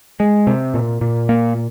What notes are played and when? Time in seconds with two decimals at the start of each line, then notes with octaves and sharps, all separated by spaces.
0.20 G#3
0.47 C3
0.74 A#2
1.01 A#2
1.29 A#3